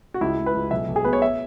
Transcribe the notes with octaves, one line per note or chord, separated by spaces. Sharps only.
F#4
C#2 E4
C#2
B4
C#2
B1 E5
B1
G#4
B2 B4
C#5
E5